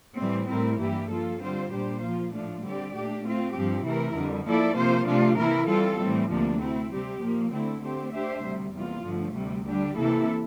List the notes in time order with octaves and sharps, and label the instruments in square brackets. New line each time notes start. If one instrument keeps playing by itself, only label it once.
[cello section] A2 E3 G3 C4
A2 G3 C4 E4 A#4
G2 E3 A#3 E4 G4
F3 A#3 F4 A4
D3 G3 C4 F4 C5
A#2 G3 D4 G4 C5
F3 A#3 F4
A2 F3 A3 D4 F4
D3 G3 C4 G4 D5
A#2 A3 D4 G4
A3 C4 F4
G2 F3 C4 G4
C3 E3 A3 E4 A#4
F2 D3 G3
F3 A#3 E4 A4 D5
C3 F3 A#3 F4 C5
C3 F3 A3 D4 F4
C3 E3 A#3 E4 A#4
E3 G3 C4 F4 A4
A2 E3 G3 C4
D2 C3 F3 A#3 D4
A3 C4 E4
C3 G3 C4 G4
A#2 F3 A#3
D3 A3 C4 E4
D3 A3 C4 G4 C5
A3 D4 G4 C5 E5
D2 C3 G3
E2 C3 G3 A#3 F4
G2 D3 F3 A3
D2 C3 G3
D3 G3 D4 G4
C3 E3 A#3 E4 A4